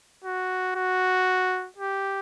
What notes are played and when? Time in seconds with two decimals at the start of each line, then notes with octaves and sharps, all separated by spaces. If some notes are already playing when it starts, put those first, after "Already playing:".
0.24 F#4
0.76 F#4
1.78 G4